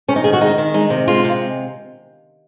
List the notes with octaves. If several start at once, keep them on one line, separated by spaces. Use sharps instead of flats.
C3 C#4
D#4
D#3 G#4
F#4
G#3 D#4
D#3
G#3 D#4
C3
G#3 F4
C3